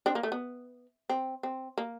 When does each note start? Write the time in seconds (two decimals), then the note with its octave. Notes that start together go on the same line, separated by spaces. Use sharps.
0.06 C4 D4
0.15 A#3
0.23 A3
0.32 B3
1.10 C4
1.43 C4
1.78 A#3